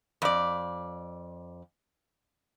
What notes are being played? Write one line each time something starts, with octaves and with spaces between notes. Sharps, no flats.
F2 D5